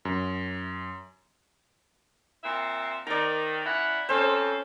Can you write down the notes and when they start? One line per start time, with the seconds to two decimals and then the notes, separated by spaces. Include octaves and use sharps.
0.05 F#2
2.43 A#2 C4 E5
3.07 D#3 D5 A#5
3.64 C#4 E4 F#5
4.09 F2 C#4 A4 C5